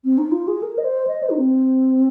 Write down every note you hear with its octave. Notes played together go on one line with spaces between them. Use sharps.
C4
D#4
F4
G#4
A#4
D#5
C5
D#5
C5
D#4
C4